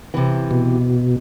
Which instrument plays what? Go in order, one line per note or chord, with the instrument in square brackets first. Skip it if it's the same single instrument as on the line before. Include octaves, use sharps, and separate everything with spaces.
[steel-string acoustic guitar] C3 E3
[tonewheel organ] B2